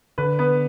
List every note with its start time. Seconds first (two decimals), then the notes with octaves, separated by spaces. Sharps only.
0.18 D3 B4
0.39 B3